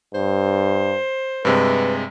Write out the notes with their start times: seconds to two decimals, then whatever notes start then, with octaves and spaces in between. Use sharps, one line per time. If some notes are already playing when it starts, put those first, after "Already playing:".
0.14 G2 C5
1.45 G2 C3 G#3 B4